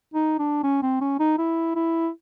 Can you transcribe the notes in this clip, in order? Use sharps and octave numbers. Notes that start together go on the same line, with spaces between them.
D#4
D4
C#4
C4
C#4
D#4
E4
E4